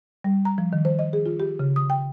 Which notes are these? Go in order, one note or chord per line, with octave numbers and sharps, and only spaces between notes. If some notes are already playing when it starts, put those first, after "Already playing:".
G3
A#5
F3
D#3
C5
D#5
G#4
F4
G4
C#3
D#6
G5